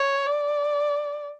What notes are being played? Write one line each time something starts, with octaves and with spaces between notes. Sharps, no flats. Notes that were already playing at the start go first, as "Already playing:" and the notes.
Already playing: C#5
D5